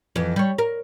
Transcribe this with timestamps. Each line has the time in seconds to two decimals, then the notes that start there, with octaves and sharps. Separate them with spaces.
0.16 F2 E3
0.36 G3 C#5
0.58 A#4